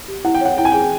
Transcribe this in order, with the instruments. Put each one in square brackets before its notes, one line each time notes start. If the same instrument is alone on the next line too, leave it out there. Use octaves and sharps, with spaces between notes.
[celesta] G4
[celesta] E4 [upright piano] F#5
[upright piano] G5
[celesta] C#5 [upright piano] F#5
[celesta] E4 [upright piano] G5
[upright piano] G#5
[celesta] G#4 [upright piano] G5